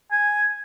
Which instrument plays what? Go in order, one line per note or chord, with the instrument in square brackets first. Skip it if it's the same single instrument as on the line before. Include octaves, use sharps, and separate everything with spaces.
[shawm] G#5